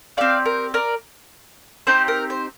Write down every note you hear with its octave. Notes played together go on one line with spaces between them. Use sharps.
C4 G4 D5 F5
A#4
A#4 D5
C4 D#4 G4 C5
A#4
C5